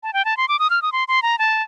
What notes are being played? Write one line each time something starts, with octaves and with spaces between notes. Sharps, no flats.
A5
G5
A5
C6
D6
D#6
F6
D#6
C6
C6
A#5
A5